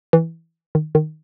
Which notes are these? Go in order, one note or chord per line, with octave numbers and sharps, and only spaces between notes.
E3
D#3
D#3